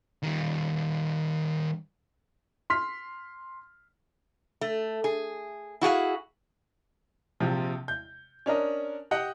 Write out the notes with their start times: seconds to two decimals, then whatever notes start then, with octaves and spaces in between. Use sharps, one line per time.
0.23 D#3 G3
2.70 C6 F6 B6
4.61 A3
5.04 G#4
5.81 E4 F#4 G#4 F5
7.40 A#1 C3 F3
7.88 G6
8.46 C#4 D4 A#4 D#5
9.11 G4 D#5 F#5 G5